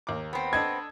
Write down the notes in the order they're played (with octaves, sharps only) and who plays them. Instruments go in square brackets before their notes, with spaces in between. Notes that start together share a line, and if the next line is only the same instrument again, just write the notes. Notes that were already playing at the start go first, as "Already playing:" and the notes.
[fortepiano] D#2 A#3 D6
[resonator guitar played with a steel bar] B3 C4
[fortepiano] D4 A4 D#5 [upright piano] G#6